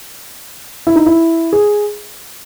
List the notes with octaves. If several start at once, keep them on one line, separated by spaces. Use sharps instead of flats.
E4
D#4
E4
G#4